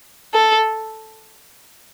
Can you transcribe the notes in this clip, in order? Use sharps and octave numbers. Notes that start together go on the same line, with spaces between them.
A4